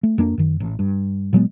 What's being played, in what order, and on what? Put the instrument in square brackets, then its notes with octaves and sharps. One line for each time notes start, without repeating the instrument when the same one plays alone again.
[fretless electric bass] A3
F2 A#3 D4
F#2 D#3
A1
G2
A#2 F#3 G#3 B3